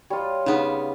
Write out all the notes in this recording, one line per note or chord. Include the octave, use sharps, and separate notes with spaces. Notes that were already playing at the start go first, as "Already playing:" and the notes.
G3 F4 C#5 D#5
C#3 B3 D4 D#4